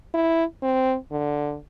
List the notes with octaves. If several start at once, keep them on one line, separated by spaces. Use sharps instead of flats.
E4
C4
D3